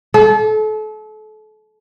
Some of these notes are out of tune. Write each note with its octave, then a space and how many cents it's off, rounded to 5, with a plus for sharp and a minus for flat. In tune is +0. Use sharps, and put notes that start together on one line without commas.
A4 -35